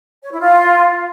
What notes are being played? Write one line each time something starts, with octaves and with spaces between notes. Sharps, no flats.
C#5
E4
F4